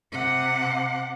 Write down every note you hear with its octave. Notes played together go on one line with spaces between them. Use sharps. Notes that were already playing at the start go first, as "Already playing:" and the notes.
C3 F#5